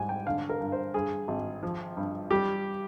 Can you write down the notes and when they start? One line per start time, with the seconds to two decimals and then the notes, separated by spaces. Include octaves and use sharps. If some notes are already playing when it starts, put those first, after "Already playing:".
Already playing: G#2 G3 G#5
0.09 G5
0.26 D3 F5
0.49 A#4
0.61 G2
0.72 C5
0.94 G2 G#4
1.28 G#1
1.63 F3
1.97 G2
2.31 G3 G4